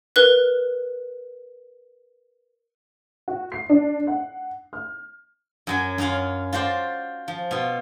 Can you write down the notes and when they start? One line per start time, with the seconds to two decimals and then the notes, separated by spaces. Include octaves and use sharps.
0.16 A#4 B4 F#6
3.28 F#4
3.52 C7
3.69 D4
4.07 F#5
4.73 F6
5.67 F#2 F#3 G#5
5.98 F#2 C#4 F4 F5 F#5
6.53 F4 F#4 C5 D5
7.28 F3
7.51 B2 F4